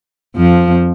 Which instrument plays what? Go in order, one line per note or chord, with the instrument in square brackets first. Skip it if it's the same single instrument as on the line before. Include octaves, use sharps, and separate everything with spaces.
[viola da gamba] F2 F3